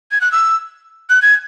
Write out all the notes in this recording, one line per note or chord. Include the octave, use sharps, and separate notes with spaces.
G#6
F#6
E6
F#6
G#6